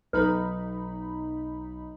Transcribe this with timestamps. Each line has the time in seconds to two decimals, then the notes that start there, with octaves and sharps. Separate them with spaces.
0.13 B1 D#4 A4 B4 B5